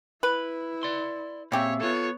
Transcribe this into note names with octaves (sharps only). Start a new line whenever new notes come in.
E4 B4
D5 C6
A#2 C#3 C4 G4 C#5 E5
B3 F4 A4 C#5